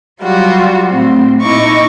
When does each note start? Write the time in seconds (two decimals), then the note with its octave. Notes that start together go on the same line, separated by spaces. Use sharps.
0.22 F#3 G3 F4 F#4
0.89 A2 C4
1.41 A#2 D#4 E4 C#6 D6